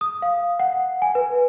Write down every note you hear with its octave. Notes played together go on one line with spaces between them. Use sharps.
D#6
F5
F#5
G#5
B4